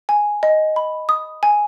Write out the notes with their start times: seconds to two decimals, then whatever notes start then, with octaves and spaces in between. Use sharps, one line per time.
0.09 G#5
0.43 D#5
0.76 B5
1.09 D#6
1.43 G#5